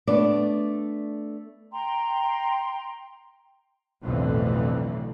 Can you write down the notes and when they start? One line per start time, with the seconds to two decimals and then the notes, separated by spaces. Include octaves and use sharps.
0.07 A3 B3 D4 D5
1.72 G5 A#5 C6
4.02 B1 F2 A2 D3 E3